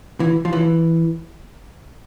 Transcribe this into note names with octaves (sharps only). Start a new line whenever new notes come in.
E3
F3
E3